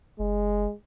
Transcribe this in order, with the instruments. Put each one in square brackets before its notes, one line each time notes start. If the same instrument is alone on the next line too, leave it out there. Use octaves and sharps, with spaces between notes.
[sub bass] F#1 [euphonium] G#3